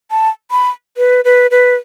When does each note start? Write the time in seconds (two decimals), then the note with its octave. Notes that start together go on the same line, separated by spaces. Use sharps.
0.11 A5
0.51 B5
0.97 B4
1.25 B4
1.51 B4